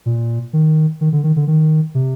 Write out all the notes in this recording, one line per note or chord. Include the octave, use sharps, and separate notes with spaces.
A#2
D#3
D#3
D3
D#3
D3
D#3
C3